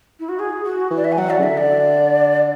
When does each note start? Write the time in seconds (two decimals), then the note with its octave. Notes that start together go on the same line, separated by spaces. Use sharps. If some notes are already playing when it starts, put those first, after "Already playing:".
0.20 E4
0.29 F#4
0.39 G#4
0.64 F#4
0.91 E3
0.96 D5
1.04 E5
1.12 G#5
1.18 F#3 F#5
1.30 D5
1.39 C#3
1.43 D3 E5
1.57 D5